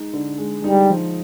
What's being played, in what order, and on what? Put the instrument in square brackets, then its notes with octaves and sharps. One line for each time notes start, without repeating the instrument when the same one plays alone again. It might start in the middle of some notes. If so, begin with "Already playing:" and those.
Already playing: [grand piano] G#3 D#4
D3
G#3
[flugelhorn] G3 [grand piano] D#4
[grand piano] F3